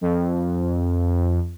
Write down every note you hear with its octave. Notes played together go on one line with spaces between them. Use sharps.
F2